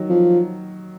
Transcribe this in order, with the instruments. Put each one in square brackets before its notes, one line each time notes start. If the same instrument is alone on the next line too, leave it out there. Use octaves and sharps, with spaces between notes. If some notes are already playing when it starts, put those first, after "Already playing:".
Already playing: [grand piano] D#3 F#3
[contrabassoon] F3